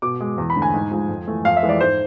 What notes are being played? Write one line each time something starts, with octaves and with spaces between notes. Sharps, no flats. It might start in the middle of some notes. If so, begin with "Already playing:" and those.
B2 D6
G#3
E2
B5
D3 A3
G#5
G#2
F3 G#3
F2
E3 A3
F2 F5
E5
E3 G#3
D5
G#2 C5